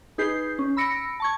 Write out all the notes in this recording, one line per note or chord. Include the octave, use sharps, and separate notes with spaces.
D#4 G#4 B4 G6 C7
C#4
B5 E6 A#6 C#7 D7
A5 C#6 G#6